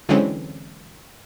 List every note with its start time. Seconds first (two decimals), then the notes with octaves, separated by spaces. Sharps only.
0.09 D3 E3 F#3 G#3 C4 C#4